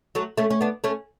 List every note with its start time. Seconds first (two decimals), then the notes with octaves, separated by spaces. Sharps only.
0.15 F#3 A3
0.38 A3 C#4
0.50 C#4
0.61 B3 D4
0.84 A3 C#4